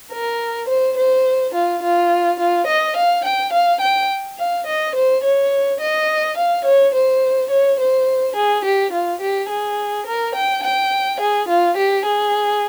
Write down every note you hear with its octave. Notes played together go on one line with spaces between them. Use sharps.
A#4
C5
C5
F4
F4
F4
D#5
F5
G5
F5
G5
F5
D#5
C5
C#5
D#5
F5
C#5
C5
C#5
C5
G#4
G4
F4
G4
G#4
A#4
G5
G5
G#4
F4
G4
G#4